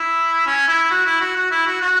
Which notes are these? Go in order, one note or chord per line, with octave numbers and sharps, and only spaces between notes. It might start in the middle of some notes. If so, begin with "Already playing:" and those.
Already playing: E4
C#4
E4
F#4
E4
F#4
F#4
E4
F#4
F#4